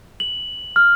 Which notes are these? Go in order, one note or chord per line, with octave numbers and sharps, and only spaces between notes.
F#7
F6